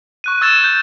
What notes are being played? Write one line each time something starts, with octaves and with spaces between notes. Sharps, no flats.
C#6 F#6 D#7
C#6 E6 G#6 A6 D#7 E7
G6